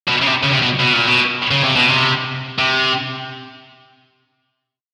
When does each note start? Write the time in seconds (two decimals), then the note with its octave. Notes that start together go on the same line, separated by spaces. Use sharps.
0.08 B2
0.22 C#3
0.26 C3
0.43 C#3
0.53 C3
0.62 B2
0.79 B2
0.93 A#2
1.06 B2
1.51 C#3
1.63 C3
1.76 B2
1.88 C3
2.59 C3